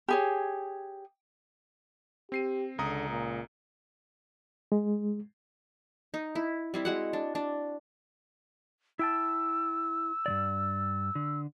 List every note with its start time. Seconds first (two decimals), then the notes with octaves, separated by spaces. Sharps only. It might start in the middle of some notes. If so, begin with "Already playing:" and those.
0.08 G4 G#4 C#5
2.32 C4 G4 C7 D#7
2.79 C#2 D3 A#5 D#6
3.10 A#2
4.72 G#3
6.14 D#4
6.35 E4
6.74 G3 C4 E4
6.85 G#3 F#4 F#5
7.13 D4
7.35 D4
8.99 E4 G5 A5 E6
10.26 G2 D#3 D5
11.15 D3